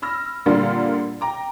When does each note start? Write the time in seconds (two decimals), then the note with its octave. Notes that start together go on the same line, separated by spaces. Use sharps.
0.02 B5 E6 F6 A#6
0.46 A#2 D3 G3 D4 F4 A#4
1.21 G5 A#5 D6